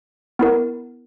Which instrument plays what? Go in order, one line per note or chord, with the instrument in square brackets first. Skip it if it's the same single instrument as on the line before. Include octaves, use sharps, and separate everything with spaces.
[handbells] B3 E4 A#4